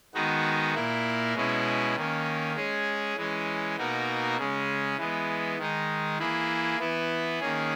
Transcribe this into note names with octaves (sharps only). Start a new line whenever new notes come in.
D#3 G#3 B3 D#4 F#4
A#2 A#3 E4 A#4
B2 G#3 C#4 E4
D#3 A#3 C#4
G#3 C#4 G#4
E3 G#3 C#4
B2 A#3 D#4 F#4 A#4
C#3 G#3 C#4
E3 G#3 B3
D#3 G#3 D#4
E3 A#3 E4 G#4
E3 B3 E4
D#3 A#3 C#4 G#4